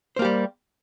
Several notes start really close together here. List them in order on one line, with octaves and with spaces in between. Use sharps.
C5 A#3 G4 G3